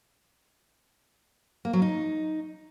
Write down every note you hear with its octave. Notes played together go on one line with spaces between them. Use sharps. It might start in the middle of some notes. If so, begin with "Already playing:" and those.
A#3
F#3
D#4